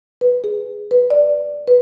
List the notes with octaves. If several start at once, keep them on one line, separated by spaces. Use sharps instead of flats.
B4
G#4
B4
D5
B4